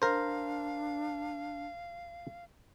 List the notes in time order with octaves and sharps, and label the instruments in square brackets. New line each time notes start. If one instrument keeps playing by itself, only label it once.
[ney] D4 [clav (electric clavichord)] A#4 C5 [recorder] F5